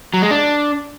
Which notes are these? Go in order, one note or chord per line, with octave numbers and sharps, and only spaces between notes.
F#3
G#3
D4